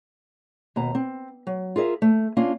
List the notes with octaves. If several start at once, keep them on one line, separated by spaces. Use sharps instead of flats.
D#2 B2 A#5
C4
F#3
F4 G#4 A#4 D#5 E5
A3
A#3 C#4 D4 F4